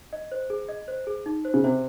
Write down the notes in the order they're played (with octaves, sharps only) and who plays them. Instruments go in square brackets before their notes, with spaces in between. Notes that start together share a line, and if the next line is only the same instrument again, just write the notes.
[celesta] D#5
C5
G#4
D#5
C5
G#4
D#4
C5
[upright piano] C#3
[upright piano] C3 [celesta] C5